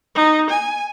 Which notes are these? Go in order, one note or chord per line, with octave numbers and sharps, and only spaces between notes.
D#4
G#5